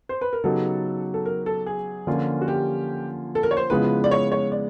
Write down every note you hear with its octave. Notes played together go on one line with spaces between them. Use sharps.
C5
B4
A#4
C#3 F#3 B3 D#4 G4 A4
A4
A#4
A4
G#4
D3 F3 A#3 C#4 F4
F#4
G4
A4
A#4
C#5
C5
C#3 F3 G#3 B3 E4 B4
D5
C#5
C#5
D5